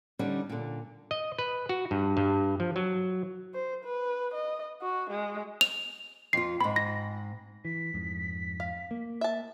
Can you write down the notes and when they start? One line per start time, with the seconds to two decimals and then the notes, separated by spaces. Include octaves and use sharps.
0.19 D3 G3 C#4 D#4
0.49 A#2 D3
1.11 D#5
1.38 B4
1.69 F#4
1.91 G2
2.17 G2
2.60 F3
2.76 F#3
3.54 C5
3.85 B4
4.34 D#5
4.82 F#4
5.10 G#3
5.61 F7
6.33 F2 F4 C7
6.61 G#2 C4 B5
6.76 A#6
7.65 E3 B6
7.94 F2 G#2
8.60 F5
8.91 A#3
9.21 E5 A5